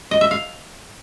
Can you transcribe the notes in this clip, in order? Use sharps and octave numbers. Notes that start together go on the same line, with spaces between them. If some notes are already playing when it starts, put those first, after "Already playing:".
D#5
E5
F5